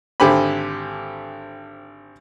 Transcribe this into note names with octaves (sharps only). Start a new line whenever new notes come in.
G#1 D3 G4 C5 G#5 B5